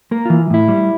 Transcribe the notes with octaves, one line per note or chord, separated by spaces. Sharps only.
A#3 A#4
E3 F4
A2 E4
G3